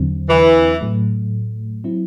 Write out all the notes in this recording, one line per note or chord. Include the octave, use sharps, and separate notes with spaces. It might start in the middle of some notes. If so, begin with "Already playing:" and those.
Already playing: E2 D3 F#3 C4
E3
A2 F#3 A3
F#3 C4 E4